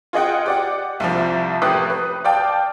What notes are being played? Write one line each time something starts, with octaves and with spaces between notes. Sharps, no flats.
F4 G#4 D#5 F#5 G5
G4 D5 F#5
C2 C3 F3
A1 A2 G4 B4 D#6 F#6
B4
D5 F5 G5 A5